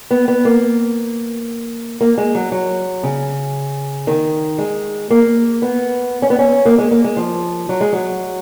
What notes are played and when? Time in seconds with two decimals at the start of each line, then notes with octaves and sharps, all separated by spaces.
0.11 B3
0.28 B3
0.45 A#3
2.01 A#3
2.18 G#3
2.35 F#3
2.52 F#3
3.03 C#3
4.07 D#3
4.58 G#3
5.10 A#3
5.62 B3
6.22 C#4
6.30 B3
6.39 C#4
6.66 A#3
6.78 G#3
6.91 A#3
7.04 G#3
7.17 F3
7.69 F#3
7.81 G#3
7.93 F#3